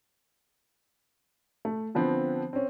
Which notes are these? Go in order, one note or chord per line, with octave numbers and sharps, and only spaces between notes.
A3
D3 F3 B3 C4
C4 C#4